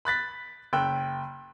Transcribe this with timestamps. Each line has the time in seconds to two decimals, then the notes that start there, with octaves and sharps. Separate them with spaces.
0.05 B5 F#6 A6 B6
0.73 F#1 G5 E6 F#6